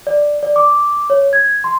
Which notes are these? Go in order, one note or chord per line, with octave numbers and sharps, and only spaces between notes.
D5
D5
D6
C#5
G#6
C6